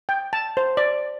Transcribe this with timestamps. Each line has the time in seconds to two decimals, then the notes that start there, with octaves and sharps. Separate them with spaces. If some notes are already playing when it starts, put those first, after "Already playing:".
0.09 G5
0.33 A5
0.57 C5
0.77 D5